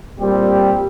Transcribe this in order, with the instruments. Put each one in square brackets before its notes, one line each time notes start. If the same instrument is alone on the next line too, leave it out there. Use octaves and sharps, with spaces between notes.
[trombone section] A#2 G3 C4 G4